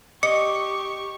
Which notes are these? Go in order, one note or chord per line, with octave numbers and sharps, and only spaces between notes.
G4 D#5 C#6 D6 C#7